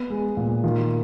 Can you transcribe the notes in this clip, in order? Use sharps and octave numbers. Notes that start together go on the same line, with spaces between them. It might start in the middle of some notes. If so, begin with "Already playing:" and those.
Already playing: B3
G#3
A#2
D#3 F4